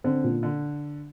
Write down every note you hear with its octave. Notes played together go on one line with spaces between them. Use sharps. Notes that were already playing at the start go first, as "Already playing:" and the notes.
D3 C4
A#2
D3